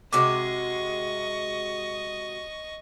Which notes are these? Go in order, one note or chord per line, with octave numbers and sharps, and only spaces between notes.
C3 G#3 F#4 D#5 C#6 D6